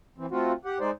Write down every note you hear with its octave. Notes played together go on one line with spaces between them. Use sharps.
E3 C4
A3 C4 F4 F#4
G4 F#5
G#3 D#4 C5 D5